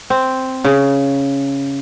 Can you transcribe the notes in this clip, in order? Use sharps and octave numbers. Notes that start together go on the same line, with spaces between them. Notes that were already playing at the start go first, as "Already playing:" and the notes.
C4
C#3